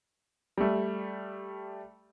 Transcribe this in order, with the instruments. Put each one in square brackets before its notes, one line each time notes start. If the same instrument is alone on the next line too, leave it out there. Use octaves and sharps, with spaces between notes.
[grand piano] G3 A3